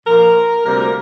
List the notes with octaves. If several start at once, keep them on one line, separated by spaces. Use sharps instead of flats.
A#2 F3 A#3 A#4
D2 C3 G3 A#3 A#4
A#4